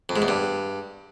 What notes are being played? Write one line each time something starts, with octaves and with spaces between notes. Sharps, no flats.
F2
G#2
E2
G2